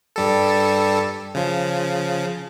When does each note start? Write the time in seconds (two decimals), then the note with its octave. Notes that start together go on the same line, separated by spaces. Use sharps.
0.16 G2 G3 A4
1.35 C#3 F3